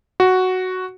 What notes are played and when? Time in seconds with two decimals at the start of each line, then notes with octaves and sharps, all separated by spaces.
0.20 F#4